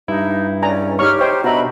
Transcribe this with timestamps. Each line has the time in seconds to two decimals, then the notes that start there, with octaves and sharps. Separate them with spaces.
0.08 G2 D#4 E4
0.62 C#2 C#4 D5 G#5 A#5
0.99 D#4 G4 C#5 C#6 F6
1.19 D#4 C5 C#5 G5
1.44 B2 D4 F#4 D#5 E5 A#5 B5